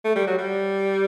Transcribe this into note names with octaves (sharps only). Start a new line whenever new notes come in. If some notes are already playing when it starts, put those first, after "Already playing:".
A3
G3
F#3
G3